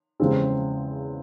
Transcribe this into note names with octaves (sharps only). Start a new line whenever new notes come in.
E2 C#3 F3 G#3 C4